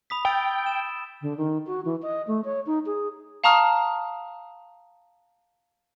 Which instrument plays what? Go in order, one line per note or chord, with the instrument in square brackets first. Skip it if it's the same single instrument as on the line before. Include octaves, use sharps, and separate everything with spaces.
[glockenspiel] B5 D#6 B6
[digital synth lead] G5 [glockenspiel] E6 A6 D7
[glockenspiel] E7
[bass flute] D3
D#3
F#4
E3
D#5
A3
C#5
D#4
G#4
[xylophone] F5 A5 A#5 C#6 D#6 F6